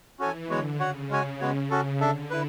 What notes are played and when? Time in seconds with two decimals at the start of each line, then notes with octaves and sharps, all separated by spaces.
0.19 E3 C#4 F#4 A4 C#5 G#5
0.49 D3 G#3 B3 F#4 C#5
0.79 C#3 F#4 C#5 F#5
1.10 G#3 C#4 F#4 C#5 G#5
1.40 G#3 B3 F#4 C#5
1.70 C#3 C#4 F#4 A4
2.00 D3 D4 A4 E5
2.30 E4 B4